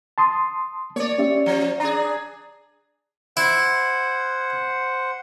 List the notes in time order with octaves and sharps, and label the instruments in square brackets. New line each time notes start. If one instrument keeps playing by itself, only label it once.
[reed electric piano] A5 C6 D#6
[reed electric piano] A#3 [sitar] C#5 D5
[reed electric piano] C#4 G4 E5
[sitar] F3
[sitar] D4 G#4 [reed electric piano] A#5
[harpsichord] E4 [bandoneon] C5 F#5